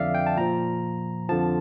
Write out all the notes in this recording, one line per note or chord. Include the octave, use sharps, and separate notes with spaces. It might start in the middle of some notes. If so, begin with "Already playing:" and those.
Already playing: F2 D3 F3 D5 E5 F5
G5
A5
A#2 F3 A#5
F2 D3 F3 A5